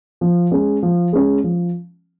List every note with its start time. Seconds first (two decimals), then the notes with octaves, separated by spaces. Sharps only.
0.21 F3
0.52 G#3 C#4
0.83 F3
1.13 G#3 C#4
1.44 F3